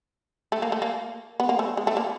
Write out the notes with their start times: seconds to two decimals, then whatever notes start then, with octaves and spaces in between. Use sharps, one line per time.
0.52 A3
0.62 A#3
0.72 A3
0.82 A#3
1.40 B3
1.49 A#3
1.59 A3
1.77 G#3
1.87 A3
1.97 A#3